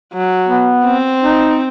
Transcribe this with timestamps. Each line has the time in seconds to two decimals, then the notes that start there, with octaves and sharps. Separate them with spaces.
0.13 F#3
0.49 B3
0.84 C4
1.22 D#4